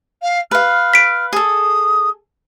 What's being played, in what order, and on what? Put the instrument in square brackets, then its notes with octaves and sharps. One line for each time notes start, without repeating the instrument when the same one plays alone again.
[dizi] F5
[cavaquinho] B4 F5 [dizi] F6
[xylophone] B6 D7
[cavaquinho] G#4 A4 [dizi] D#6